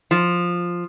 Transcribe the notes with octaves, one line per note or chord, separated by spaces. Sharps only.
F3